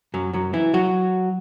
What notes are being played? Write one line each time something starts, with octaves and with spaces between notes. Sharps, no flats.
F#2 F#3
F#2 F#3
E3 E4
F#3 F#4